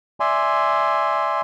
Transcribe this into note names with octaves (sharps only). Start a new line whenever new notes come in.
D5 E5 G#5 C6